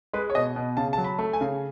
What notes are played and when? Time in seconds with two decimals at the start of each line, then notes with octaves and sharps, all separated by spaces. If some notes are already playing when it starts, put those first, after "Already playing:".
0.14 G#3 B4
0.30 C#5
0.35 B2 D#5
0.56 B2
0.77 C#3 A5
0.93 F#3 A5
1.04 B5
1.18 A3
1.33 G#5
1.41 C#3